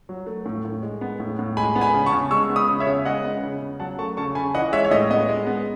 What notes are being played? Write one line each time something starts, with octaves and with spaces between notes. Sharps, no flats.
F#3
A3
A2
A2
G#3
B3
A2
A2
G#3 G#5 B5
B3
G#5 B5
C#3
A5 C#6
C#3
G#3 C#6 E6
B3
B5 D#6
C#3
C#5 E5
C#3
G#3 D#5 F#5
B3
C#3
C#3
F#3 F#5 A5
A3 A5 C#6
C#3 A5 C#6
C#3 G#5 B5
E3 D#5 F#5
G#3 C#5 E5
C#5
A2 D#5
B3 D#5
G#3
B3